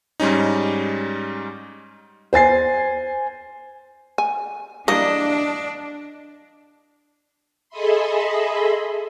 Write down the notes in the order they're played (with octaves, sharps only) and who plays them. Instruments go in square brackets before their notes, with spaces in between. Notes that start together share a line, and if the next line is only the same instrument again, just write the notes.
[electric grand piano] G#2 G3 C#4 D#4
[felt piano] C5 G#5 A6 C7
[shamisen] G#5
[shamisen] E3 G3 A#3 [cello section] D4 [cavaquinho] D#5
[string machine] G#4 A4 D#5 E5 B5 C6